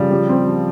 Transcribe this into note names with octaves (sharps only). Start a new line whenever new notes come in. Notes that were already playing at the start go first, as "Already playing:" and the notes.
Already playing: C#3 F3 G3
F3 G4
C4
F3